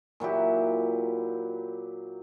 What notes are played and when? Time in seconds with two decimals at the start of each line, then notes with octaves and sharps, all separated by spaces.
0.20 A#2 F#3 E4 G4